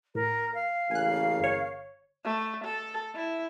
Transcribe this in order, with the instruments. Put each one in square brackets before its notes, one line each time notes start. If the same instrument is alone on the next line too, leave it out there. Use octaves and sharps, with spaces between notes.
[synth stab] A2 [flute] A#4
[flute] F5
[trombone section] A1 C#3 A#3 [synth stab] G#5 F#6
[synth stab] G1 C#5
[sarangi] A3
A4
E4